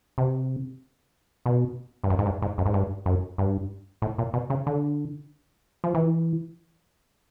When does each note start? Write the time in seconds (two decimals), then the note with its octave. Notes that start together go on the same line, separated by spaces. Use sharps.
0.18 C3
1.46 B2
2.04 G2
2.10 F#2
2.19 G#2
2.26 G2
2.42 G#2
2.58 F#2
2.66 G#2
2.74 G2
3.06 F#2
3.38 G2
4.02 A2
4.18 A#2
4.34 B2
4.50 C#3
4.67 D3
5.84 F3
5.95 E3